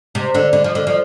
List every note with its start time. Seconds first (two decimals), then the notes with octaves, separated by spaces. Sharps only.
0.15 C3
0.34 D3
0.53 D3
0.64 F3
0.75 D3
0.87 F3